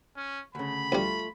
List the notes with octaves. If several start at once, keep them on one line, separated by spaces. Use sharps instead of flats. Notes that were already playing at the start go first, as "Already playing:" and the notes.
C#4
D2 C#3 B5
D2 G3 A3 F4